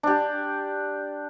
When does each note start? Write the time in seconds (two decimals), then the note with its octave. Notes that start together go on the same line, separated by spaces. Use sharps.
0.03 D4 G4